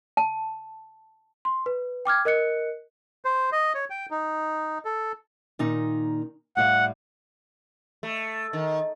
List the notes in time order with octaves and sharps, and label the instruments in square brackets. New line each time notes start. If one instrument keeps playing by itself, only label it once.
[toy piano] A5
[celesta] C6
B4
G5 D6 F6 G#6
A#4 D#5 F#6 C#7
[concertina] C5
D#5
C#5
G5
D#4
A4
[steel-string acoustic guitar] A#2 D#3 D#4
[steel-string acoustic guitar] A2 G3 F5 [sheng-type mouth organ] F#5
[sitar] A3
D#3